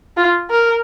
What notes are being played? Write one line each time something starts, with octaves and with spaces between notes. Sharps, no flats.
F4
A#4